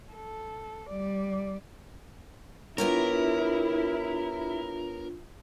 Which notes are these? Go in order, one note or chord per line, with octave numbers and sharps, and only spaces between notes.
A4
G3 D5
B3 D4 E4 F4 G4 A#4 C#5